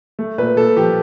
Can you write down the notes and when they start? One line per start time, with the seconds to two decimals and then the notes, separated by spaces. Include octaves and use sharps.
0.19 A3
0.38 A#2 B4
0.56 A#2 A4
0.76 F3 G4